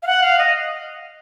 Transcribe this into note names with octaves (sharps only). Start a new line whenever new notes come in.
F5
F#5
F5
D#5